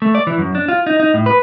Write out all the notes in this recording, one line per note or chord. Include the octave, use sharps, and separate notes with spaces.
A3
D5
E3
F#2
D4
F4
D#4
D#4
A2
B4